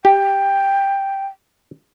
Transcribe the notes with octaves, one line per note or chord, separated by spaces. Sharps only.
G4 G5